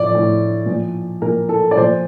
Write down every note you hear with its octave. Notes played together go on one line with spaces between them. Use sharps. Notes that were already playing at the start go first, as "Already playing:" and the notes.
Already playing: A2 F3 D5
A2 F3
A#2 F3
A#2 F3 A#4
A4
D5
A#2 F3 C5